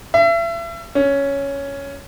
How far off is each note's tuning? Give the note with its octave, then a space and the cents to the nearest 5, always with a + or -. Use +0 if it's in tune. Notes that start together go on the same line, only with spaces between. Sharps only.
E5 +35
C#4 +5